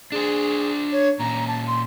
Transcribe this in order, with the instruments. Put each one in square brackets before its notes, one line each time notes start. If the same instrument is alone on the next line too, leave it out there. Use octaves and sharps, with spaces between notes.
[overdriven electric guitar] D4 C5 [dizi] G#4
[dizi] C#5
[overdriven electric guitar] A#2 C#4 [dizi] A#5
[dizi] A5
C6